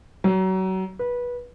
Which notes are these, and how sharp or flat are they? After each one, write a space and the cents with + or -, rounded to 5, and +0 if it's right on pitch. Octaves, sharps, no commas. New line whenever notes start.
F#3 +30
B4 -20